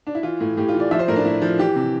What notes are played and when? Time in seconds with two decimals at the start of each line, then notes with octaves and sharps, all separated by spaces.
0.07 D4
0.15 E4
0.23 E3 F4
0.41 A2
0.57 A2 G4
0.68 F4
0.74 E3
0.80 D5
0.91 F3 E5
0.99 C5
1.08 A2 A#4
1.16 D4
1.25 A2 E4
1.42 F3
1.59 E3 G4
1.76 C3